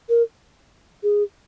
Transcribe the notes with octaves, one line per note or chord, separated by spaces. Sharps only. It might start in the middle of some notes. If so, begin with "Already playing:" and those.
A#4
G#4